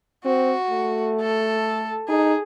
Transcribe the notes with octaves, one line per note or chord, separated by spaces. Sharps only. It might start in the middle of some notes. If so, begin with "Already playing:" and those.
C4 F#4
A3
A4
D#4 G#4